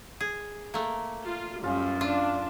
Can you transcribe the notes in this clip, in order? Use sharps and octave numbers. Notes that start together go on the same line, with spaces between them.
G#4
A3 A#3
F4
F#2 G3 C#4 F4
D4 F4 D5 F5